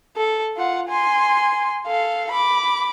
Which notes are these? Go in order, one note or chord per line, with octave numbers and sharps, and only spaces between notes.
A4
F4 F#5
G#5 C6
A4 F5
B5 D6